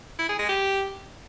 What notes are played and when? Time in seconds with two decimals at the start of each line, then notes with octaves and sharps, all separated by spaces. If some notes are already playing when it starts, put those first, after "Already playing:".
0.19 E4
0.29 G#4
0.39 G#3
0.49 G4